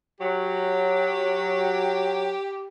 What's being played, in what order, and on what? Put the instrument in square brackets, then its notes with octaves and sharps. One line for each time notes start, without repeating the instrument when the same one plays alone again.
[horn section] F#3 [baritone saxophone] G4